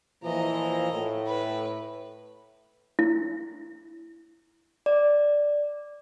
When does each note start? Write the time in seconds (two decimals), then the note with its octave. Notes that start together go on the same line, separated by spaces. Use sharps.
0.24 A#2 E3 F3 D#5 A#5
0.93 A2
1.27 B4
2.99 E4
4.86 D5